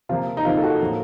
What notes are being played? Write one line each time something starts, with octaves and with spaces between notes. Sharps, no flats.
C3 F3 A#3 F4
D#4
C3 F3 A#3 F4
A4
F#4
A2 F3 A#3